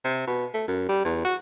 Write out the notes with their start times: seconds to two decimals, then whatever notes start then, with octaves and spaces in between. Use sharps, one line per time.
0.04 C3
0.27 B2
0.54 A3
0.68 F#2
0.89 G3
1.05 E2
1.25 F#4